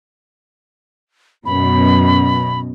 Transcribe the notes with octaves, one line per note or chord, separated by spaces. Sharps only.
F#2 B2 B5